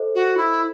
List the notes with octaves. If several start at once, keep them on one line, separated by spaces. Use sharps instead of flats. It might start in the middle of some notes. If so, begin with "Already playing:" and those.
Already playing: A4 C5 D#5
F#4
E4